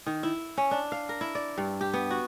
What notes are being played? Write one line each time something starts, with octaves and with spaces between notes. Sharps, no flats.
D#3
E4
C#4
D4
F5
A#4
E4
D5
G2
G4
B3
F#4